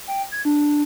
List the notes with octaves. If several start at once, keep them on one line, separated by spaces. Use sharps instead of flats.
G5
G#6
D4